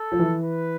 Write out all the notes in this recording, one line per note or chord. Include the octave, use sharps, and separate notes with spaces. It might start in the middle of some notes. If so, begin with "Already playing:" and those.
Already playing: A4
F3
E3
B4